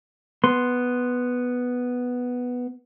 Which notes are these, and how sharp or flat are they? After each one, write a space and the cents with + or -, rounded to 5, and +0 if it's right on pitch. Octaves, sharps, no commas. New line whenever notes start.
B3 +0 C6 +0